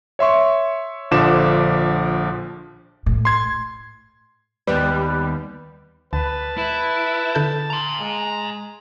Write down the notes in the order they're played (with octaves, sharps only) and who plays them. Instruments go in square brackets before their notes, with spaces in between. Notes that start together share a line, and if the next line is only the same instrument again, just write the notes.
[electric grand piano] C#5 E5 C6 C#6
A#1 D3 F3 D6 E7
[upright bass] A2
[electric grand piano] C6 G#6
[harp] D#2 B3 [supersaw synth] G3 [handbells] B4
[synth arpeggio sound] D2 [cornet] B4 [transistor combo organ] A5
[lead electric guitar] E4 [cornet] B4
[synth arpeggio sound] D3 A4 G6
[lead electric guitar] A#5 C6
[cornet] G#3